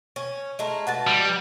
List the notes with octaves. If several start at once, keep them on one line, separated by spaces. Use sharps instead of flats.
C#4
G#3 A3 A#4
F#4 B4 A5
G3